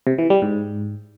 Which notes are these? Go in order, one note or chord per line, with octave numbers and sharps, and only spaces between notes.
C3
E3
G3
G#2